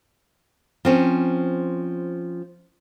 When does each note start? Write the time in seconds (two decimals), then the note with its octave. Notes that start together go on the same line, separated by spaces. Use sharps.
0.85 F3 C4 C#4